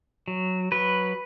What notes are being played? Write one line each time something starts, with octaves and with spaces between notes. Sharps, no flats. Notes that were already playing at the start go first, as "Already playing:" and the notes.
F#3
F#3 B4